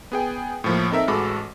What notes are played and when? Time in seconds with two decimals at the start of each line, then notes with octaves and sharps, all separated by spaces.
0.12 B3 G#4 G5
0.64 A2 F3 A#3
0.91 C4 D#4 A4 A#4 E5
1.08 A1 G#3 F#4 A4 B5 D6